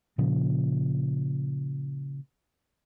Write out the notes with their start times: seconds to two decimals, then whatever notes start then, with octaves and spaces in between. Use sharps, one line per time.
0.18 A#2 C#3 F3